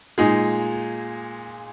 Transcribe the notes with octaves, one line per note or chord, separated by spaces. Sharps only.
A#2 G#3 D#4 G#4